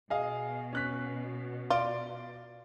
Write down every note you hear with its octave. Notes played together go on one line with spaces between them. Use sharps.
B2 G#4 D#5 F5
C#4 F#6 B6
F4 D5 D7